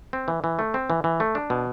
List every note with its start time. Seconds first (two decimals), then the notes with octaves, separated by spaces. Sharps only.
0.13 C4
0.28 E3
0.44 E3
0.59 A3
0.74 C4
0.90 E3
1.04 E3
1.20 A3
1.35 D4
1.50 B2